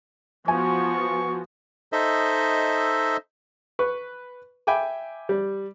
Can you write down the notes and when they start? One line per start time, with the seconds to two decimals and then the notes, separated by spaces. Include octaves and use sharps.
0.48 F3 B3 F#4 G#5 C#6
1.92 D#4 A4 C5 D#5 E5
3.79 B4 C#6
4.67 E5 G5 G#5 B5 D6
5.29 G3